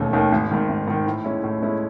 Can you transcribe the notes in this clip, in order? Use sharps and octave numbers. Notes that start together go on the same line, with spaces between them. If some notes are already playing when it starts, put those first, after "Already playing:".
Already playing: E1 D#2 D#3 A3 C#4
D#2 D#3 A3 C#4
G#1
G#2 D#3
G#1
G#2 D#3
A2
G#3 C#4 E4
A2
G#3 C#4 E4